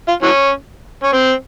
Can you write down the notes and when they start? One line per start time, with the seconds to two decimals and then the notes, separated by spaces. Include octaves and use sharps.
0.08 F4
0.23 E3 F#3 C#4
1.03 C#4
1.13 C4